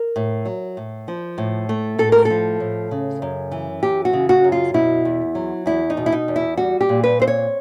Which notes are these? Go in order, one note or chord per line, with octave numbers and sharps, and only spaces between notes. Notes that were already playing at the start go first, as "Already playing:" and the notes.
Already playing: A#4
A2
F#3
A2
F3
A2
A3
A2 A4
A#4
A4
F3
A2
C#3
F#2
E3
F#2 G4
F#4
C#3
F#4
F#2
F4
B2 E4
E2
F#3
E2 E4
D#4
B2
E4
D#4
E2
E4
G3 F#4
G4
A#2
B4
C4 C5
C#5